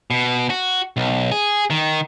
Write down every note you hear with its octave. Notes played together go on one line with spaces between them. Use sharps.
B2
F#4
B1
G#4
D#3